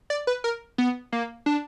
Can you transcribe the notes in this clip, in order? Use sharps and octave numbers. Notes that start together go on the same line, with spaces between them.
D5
B4
A#4
B3
A#3
D4